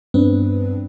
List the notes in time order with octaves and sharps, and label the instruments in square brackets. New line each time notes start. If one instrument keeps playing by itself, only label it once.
[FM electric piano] G2 B3 C4 D4 B4